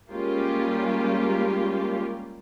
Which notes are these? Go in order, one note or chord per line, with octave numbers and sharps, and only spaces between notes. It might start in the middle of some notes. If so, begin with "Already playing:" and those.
G3 G#3 A#3 C#4 F4 G4